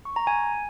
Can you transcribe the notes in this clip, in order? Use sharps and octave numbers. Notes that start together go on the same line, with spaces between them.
C#6
A#5
G#5